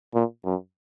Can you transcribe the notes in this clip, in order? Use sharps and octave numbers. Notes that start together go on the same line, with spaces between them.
A#2
F#2